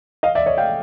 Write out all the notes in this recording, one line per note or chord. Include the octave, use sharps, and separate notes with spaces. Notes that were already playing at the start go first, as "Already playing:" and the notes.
D#5 F5
D5 E5
C#5 D#5
F5 G5